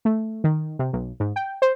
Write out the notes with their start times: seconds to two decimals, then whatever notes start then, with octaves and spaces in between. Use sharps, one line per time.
0.05 A3
0.44 D#3
0.79 C3
0.93 B1
1.20 G#2
1.36 G5
1.62 C5